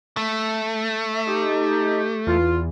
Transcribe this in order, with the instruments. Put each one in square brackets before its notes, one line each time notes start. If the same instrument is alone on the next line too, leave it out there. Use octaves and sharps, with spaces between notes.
[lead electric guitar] A3
[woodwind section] E5
[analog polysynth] D#4 [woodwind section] G4
[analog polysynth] E2 E3 [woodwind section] F4